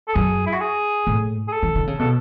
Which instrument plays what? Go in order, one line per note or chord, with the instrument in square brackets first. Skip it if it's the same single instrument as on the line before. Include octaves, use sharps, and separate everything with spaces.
[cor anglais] A4
[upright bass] F#2 [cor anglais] G#4
[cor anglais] E4
F#4
G#4
[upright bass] A2
[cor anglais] G#4
A4
[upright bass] E3
D3
C#3
[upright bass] B2 [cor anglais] A4